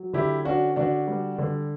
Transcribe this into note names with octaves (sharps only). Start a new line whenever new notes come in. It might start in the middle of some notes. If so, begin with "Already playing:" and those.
Already playing: F#3
D3 E4 G4
C#4 D4 F#4
D3 D4 F#4
G3
D3